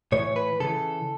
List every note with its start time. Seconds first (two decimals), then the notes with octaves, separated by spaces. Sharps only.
0.12 A2 E3 C#5
0.36 B4
0.60 C#3 E3 A4